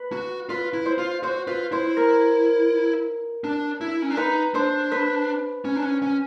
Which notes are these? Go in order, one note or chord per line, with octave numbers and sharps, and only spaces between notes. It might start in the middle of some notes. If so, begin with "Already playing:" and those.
Already playing: B4
F#4
F4 B4
E4
C5
F4
F#4 C5
F4 B4
E4 C5
A#4
D4
E4
C#4
D4
D#4 B4
D4 C5
B4
C#4
D4
C#4
C#4